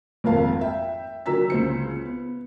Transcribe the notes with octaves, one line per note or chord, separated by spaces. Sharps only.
G#1 F2 A#4 F5 A5
E5 G5
D3 F#3 A#4 A#5 E6 B6
C#2 C5 C#7
B3